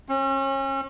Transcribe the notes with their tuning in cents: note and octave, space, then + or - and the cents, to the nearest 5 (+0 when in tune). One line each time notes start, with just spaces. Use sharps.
C#4 -35